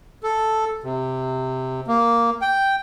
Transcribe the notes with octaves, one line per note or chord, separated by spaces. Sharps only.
A4
C3
A#3
G5